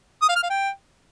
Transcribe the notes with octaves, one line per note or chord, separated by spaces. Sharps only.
D#6
F5
F6
F5
G5